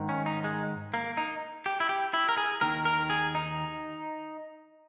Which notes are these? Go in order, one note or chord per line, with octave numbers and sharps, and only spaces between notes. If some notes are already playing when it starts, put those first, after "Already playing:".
Already playing: G#2 D#3
C#4
D#4
G#3
A#3
D#4
G4
E4
G4
E4
A#4
G#4
D#2 D#3 A#4
A#4
G#4
D#4